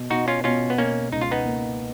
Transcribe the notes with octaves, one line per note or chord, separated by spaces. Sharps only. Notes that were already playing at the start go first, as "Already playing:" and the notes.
Already playing: B2
B2 D#4 F#4
C#4 F4
B2 C#4 F4
B3
B2 A#3 C#4
C#2 D#4
F4
B3 D#4
A#3